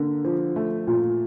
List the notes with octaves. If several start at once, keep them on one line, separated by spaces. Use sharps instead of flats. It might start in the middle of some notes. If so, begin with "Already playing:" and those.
Already playing: D3 A#3
F3
A3
A#2